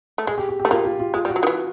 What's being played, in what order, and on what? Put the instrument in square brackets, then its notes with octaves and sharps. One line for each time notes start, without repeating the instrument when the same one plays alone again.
[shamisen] A3
[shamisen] G#3 [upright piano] G#4
[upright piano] G4
G4
G4
[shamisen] A3
[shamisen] A#3 [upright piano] F4
[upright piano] F4
F4
[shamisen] G#3 [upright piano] F4
[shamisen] G3
[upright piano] F#4
[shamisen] F#3
D#3
E3